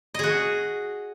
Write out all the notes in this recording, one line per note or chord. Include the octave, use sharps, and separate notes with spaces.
F#4 G#4 D#5